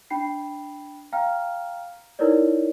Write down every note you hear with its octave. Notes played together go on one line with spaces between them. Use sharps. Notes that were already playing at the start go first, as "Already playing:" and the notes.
D4 G5 B5 C7
F5 G5 A#5 F6
D#4 E4 A#4 B4 C#5 D5